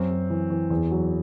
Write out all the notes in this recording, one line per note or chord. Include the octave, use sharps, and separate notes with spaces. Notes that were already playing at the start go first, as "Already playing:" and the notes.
Already playing: F#2 C4
F#2
E3
E3
E2
F#3